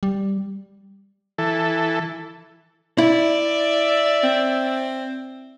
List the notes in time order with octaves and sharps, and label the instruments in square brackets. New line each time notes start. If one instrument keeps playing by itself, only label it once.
[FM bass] G3
[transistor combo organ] E3 A4
[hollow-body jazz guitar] E4 [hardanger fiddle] D5 E5
[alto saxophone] C4